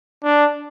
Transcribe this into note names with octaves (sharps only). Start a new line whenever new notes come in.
D4